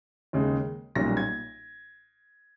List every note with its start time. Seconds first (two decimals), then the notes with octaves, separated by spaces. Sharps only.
0.33 D#2 C#3 G#3
0.95 B1 A#2 G3 C#4 A#6
1.17 G#6